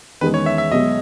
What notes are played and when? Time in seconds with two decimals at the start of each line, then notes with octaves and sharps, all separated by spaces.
0.21 E2 D#3 G#3 C#4 G#4 B4
0.34 C#5
0.46 E5
0.58 E5
0.71 B1 B2 G#3 D#5